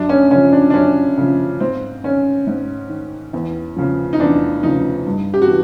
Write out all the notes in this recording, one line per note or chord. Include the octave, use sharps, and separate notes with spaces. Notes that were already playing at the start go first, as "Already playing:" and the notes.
Already playing: F#2 D4
C#4
C#3 F3 C#4
D4
D4
F#2 C#4
C#3 F3
G#2 C4
D#3 C#4
G#2
D#3
E2
C#3 F3
D#4
E2 D4
C#3 F3 D#4
G2
G4
F#4
E3